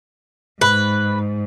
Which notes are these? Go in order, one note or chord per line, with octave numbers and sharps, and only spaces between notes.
G#2 B4